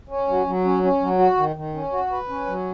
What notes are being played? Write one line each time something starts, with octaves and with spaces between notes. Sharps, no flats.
C#4
F#3
F#3
C#4
C#4
F#3
F#4
D#3
D#3
C#4
F#4
B4
C#4
F#3